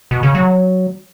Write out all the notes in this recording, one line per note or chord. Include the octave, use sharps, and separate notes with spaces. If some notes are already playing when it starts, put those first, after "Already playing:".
B2
C#3
F#3